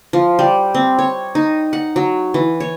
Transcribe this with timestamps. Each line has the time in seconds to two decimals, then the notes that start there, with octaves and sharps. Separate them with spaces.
0.13 F3
0.39 G3
0.74 C4
0.99 C#5
1.35 D#4
1.73 F#5
1.96 F#3
2.34 E3
2.60 C#5